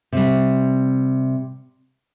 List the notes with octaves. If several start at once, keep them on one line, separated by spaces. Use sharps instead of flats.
C3 G3